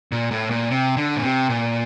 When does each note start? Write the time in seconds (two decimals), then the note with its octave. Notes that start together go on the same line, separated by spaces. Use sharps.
0.12 A#2
0.31 A2
0.51 A#2
0.70 C3
0.97 D3
1.16 A#2
1.23 C3
1.49 A#2